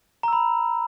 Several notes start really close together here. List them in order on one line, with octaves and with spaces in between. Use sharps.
A#5 E6 B5